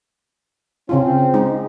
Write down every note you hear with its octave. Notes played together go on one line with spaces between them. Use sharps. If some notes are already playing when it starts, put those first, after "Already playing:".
C#3 C4 C#4 F4
G#3 D#4